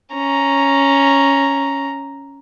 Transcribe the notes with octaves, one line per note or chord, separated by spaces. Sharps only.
C#4 A#5